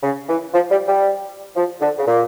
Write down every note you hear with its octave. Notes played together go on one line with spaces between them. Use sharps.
C#3
E3
F3
G3
G3
F3
D3
C#3
A#2